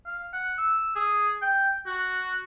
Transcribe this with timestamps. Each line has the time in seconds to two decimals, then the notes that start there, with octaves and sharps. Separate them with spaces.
0.06 F5
0.33 F#5
0.58 E6
0.96 G#4
1.42 G5
1.86 F#4